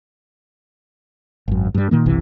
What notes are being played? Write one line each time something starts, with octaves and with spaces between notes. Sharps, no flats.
G#1 F#2
G2 G3
A#2 D#3 A#3
F#1 B1 C3 E3